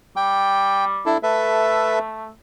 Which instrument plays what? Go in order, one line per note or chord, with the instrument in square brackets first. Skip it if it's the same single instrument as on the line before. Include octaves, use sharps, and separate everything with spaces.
[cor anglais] G3 [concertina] G5
[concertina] D4 E4 A4
[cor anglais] A3 [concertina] A4 B4 E5